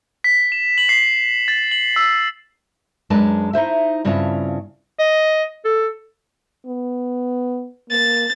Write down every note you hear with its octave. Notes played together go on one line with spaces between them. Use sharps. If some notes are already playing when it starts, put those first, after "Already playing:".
B6
E7
F#7
C7
A6
F#7
E6
F#2 G#3 D4 A#4 B4 A5
D#4 E4 C5 E5
G2 C#3 C4 E4 F4 A5
D#5
A4
B3
A#3 A6